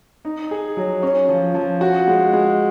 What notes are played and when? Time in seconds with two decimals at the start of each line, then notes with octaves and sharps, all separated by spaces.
0.25 D#4
0.51 G#4
0.77 F#3
1.03 C#4
1.29 F3
1.54 F3
1.81 F#4
2.07 G#3
2.33 G#3